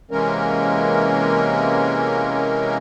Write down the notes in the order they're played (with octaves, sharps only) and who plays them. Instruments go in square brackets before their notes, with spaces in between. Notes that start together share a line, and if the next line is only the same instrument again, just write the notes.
[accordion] C3 E3 G#3 A#3 C#4 A#4